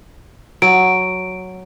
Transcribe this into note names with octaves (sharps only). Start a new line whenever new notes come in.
F#3 D7